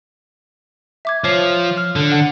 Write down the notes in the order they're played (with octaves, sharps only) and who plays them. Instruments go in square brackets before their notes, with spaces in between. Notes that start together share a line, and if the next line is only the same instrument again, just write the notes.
[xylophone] E5 D6 G#6
[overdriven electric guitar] F3 [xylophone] C#5 C7
[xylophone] F6
[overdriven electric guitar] D3
[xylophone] F#5